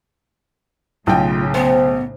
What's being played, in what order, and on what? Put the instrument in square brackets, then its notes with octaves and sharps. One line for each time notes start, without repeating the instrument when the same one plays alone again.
[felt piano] B1 G5 [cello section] A2 C#3 [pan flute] F4
[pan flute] B3 [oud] C5